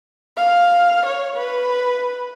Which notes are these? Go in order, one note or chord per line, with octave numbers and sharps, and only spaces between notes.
F5
C#5
B4